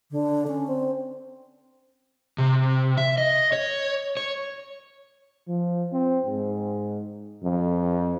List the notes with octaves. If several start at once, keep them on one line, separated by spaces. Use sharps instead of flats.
D3
C#4
C4
C3
E5
D#5
C#5
C#5
F3
C4
G#2
F2